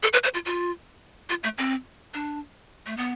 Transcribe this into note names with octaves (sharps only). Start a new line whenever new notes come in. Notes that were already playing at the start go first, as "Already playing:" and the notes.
A4
B4
C5
F4
F4
F4
A3
C4
D4
A3
B3